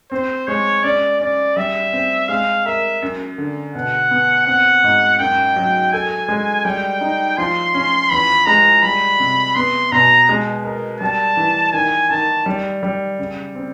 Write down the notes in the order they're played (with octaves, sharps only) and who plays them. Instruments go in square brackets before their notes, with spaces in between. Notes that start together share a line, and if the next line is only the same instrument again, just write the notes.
[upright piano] C4 [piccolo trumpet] C5
[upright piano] G#3 [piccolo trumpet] C#5
[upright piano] C#4 [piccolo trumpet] D5
[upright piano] C#4 [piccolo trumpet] D5
[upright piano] G3 [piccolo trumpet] E5
[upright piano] C4
[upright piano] G#3 [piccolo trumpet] F5
[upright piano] A#4 [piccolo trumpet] E5
[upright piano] F#2
D3
[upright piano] B2 [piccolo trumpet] F#5
[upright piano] B3
[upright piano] C4 [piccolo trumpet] F#5
[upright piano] G#2
[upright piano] F#2 [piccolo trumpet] G5
[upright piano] F#3
[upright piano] A4 [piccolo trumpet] G#5
[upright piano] G#3
[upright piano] G3 [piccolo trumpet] G5
[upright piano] D#4
[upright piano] F3 [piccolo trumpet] C6
[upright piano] C#4
[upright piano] E2 [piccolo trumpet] B5
[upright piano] G#3 [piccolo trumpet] A#5
[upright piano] G3 [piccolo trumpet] B5
[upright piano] C3
[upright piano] B3 [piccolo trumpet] C6
[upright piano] B2 [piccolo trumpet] A#5
[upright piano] G#3
A#4
[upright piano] G3 [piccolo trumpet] A5
[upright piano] E3
[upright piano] D#3 [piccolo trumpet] G#5
[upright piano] D#3 [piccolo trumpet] A5
[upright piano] G3
G3
C#3
C4